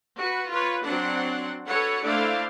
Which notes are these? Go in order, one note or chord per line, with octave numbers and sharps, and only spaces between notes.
F#4 B4
F4 B4 C#5
F#3 C4 D4 F#5
F#4 A4 B4 C#5 F#5
A3 D4 E4 C5 D5 F5